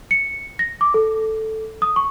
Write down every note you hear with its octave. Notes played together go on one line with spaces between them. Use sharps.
C#7
A#6
D6
A4
D#6
C#6